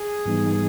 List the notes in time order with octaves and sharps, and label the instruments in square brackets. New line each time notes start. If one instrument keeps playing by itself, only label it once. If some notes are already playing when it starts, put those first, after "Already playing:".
Already playing: [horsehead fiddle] G#4
[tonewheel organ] G#2 E3 G3 B3 D#4